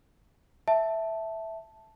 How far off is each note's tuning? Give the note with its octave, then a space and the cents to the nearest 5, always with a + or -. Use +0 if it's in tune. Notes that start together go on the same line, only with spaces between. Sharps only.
E5 -5 A5 +0